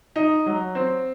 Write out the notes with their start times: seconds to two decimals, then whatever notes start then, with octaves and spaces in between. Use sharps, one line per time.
0.16 D#4
0.46 F#3
0.75 C4